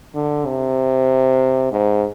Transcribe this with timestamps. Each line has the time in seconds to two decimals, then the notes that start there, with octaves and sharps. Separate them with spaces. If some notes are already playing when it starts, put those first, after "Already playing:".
0.15 D3
0.46 C3
1.72 G#2